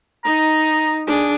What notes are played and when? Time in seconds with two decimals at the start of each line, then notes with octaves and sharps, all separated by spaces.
0.25 D#4 A#5
1.07 D4 G#4